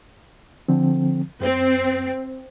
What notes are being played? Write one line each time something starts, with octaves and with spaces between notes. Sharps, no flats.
D3 F3 C4
F#2 C4